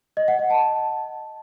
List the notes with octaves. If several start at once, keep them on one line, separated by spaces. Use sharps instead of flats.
D#5
F#5
D#5
A5